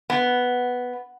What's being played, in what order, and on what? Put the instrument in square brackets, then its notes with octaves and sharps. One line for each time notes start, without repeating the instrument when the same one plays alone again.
[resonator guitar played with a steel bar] B3